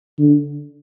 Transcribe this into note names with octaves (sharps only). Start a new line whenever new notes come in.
D3